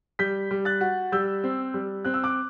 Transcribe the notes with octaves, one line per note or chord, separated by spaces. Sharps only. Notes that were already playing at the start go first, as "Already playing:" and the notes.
G3 G6 B6
G3
F#6 A6
F#4
G3 E6 G6
C4
G3
C4 F#6
E6
D6 F#6